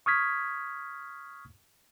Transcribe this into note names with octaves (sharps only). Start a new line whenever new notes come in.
C#6 D#6 F6 G#6 B6